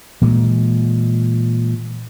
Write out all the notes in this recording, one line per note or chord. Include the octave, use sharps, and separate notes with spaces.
A#2 E3 G#3